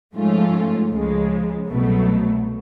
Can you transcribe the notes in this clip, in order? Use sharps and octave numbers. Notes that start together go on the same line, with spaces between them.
G#2 F3 A3 C#4 F4
C#2 C#3 F3 G#3
C2 B2 F#3 A3